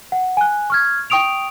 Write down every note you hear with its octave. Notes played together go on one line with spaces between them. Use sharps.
F#5
G#5 F#6
C#6 F6 G#6
G5 C#6 D#6 D7 F7